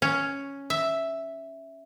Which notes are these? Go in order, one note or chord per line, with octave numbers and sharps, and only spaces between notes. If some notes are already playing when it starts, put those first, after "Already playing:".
C#4
E5